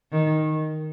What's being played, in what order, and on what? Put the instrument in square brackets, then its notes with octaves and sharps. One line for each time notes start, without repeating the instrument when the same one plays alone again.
[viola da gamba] D#3